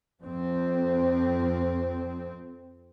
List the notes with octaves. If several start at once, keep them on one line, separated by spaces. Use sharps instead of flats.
F2 C4